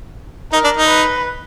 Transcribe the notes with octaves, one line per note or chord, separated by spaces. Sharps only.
D#4 A#4
D4
D#4
B4